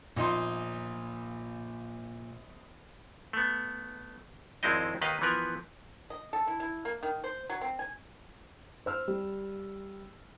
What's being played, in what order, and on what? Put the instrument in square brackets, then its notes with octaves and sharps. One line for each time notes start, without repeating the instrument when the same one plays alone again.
[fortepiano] A#1 D#4 C6 [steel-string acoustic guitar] A#2
[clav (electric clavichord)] A3 B3
G#1 F2 G#3 C4 E4 D#5
D#2 D#3 B4 D#5 F5
E3 F3 B3 A#4 B4
[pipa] D#5
A4
E4
E4
A#3
D#3
C5
F#3
C4
G#5
[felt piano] C5 E6 F6
G3